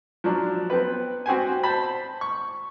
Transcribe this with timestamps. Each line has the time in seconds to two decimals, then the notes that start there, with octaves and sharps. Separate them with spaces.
0.24 F3 F#3 D4
0.70 B3 C4 B4
1.26 C4 F#4 G4 C5 G#5
1.63 C5 A5 B5
2.21 C#6